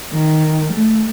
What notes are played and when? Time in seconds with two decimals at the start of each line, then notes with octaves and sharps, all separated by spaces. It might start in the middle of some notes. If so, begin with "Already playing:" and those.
0.12 D#3
0.71 A3